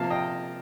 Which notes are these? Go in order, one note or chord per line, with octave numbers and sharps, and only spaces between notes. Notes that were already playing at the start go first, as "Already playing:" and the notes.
Already playing: C3 F3 A#3 F5 A5
D#5 G5